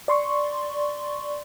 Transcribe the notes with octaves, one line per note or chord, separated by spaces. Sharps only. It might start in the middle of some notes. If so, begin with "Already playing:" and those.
D5 C6 C#6